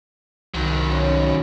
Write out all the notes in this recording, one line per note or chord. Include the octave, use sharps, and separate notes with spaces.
C2 D#3 F#3
C#4